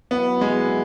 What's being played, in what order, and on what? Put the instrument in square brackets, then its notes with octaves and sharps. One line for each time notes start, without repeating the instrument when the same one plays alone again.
[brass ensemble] F#3 E4 [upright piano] B3
[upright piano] G#3